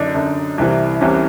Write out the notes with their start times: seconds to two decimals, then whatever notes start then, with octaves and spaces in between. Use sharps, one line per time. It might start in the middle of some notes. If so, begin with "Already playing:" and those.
Already playing: F#2 D3 D4 D#4
0.15 F#2 D3
0.58 C2 C3 E3
1.01 C2 C3 E3 C#4